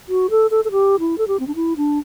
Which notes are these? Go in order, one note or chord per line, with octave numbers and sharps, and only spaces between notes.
F#4
A4
A4
A4
G4
E4
A4
G4
C4
D4
E4
D4